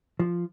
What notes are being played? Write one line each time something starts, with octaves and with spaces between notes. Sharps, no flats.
F3